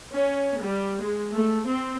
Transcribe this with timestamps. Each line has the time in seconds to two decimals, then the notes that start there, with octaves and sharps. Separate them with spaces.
0.11 C#4
0.60 G3
1.00 G#3
1.32 A3
1.67 C4